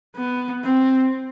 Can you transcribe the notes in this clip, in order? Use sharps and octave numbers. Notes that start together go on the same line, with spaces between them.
B3
C4